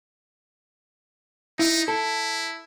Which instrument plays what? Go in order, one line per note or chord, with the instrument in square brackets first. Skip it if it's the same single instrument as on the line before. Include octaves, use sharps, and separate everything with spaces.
[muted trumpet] D#4 [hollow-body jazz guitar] E4
[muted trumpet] E4 [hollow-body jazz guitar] A4